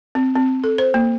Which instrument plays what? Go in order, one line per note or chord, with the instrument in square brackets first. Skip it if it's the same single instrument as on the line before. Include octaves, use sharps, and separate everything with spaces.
[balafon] C4
C4
A4
C5
A#3